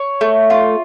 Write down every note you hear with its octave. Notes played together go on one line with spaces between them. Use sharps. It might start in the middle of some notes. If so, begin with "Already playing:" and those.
Already playing: C#5
A3
F4